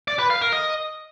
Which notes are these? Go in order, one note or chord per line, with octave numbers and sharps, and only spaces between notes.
D5
B4
F5
A#4
D#5